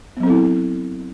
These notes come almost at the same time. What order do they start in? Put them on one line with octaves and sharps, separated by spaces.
B3 F#3 C4 A4 E4